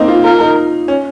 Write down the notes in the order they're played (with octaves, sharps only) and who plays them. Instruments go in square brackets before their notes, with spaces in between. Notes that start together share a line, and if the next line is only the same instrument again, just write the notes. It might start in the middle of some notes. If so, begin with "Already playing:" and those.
Already playing: [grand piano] A#3 C4 D#4
F4
[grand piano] F4 [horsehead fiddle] A#4
[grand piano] D#4
C#4